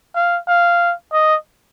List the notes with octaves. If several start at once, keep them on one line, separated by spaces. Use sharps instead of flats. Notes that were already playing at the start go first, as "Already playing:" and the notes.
F5
F5
D#5